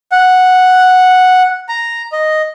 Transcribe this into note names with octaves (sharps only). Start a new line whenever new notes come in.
F#5
A#5
D#5